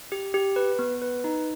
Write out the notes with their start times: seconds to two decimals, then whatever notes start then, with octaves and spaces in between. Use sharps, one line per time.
0.12 G4
0.34 G4
0.56 B4
0.79 B3
1.02 B4
1.24 D#4